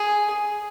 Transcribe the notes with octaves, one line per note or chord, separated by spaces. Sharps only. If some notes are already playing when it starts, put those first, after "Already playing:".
Already playing: G#4